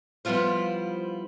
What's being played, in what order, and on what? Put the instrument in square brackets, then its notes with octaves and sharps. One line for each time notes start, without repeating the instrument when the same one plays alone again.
[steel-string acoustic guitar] F3 G3 B3 E4 F4 C5